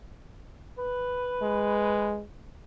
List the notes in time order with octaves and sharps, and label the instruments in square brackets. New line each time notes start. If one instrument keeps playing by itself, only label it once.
[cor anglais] B4
[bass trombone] G#3